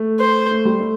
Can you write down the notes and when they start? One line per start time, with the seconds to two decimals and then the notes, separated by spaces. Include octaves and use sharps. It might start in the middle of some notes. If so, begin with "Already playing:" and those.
Already playing: A3
0.20 C5
0.51 A3
0.65 G3
0.80 A3